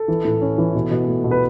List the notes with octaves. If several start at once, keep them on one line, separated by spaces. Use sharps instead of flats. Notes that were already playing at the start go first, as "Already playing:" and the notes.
Already playing: A4
E3
A2
C#4
E3
B2
B2
A3
B2
B4